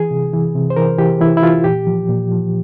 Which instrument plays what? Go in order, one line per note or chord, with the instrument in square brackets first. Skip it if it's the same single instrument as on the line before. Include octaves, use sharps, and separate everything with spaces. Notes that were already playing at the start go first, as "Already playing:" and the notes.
Already playing: [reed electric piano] E3 G#4
C3
E3
C3
C5
E3 A#4
E3 G4
E3 E4
E4
E3 F4
A#2 G4
F3
A#2
F3